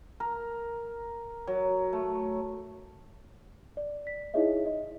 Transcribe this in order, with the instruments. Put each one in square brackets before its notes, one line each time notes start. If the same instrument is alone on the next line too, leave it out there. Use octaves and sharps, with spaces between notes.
[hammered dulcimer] A#4
F#3
A3
[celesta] D5
B6
D#4 E4 G#4 C#5 D#5 E5
D#5